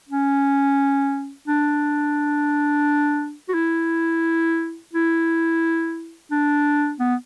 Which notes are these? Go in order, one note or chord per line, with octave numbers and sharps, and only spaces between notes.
C#4
D4
F#4
E4
E4
D4
B3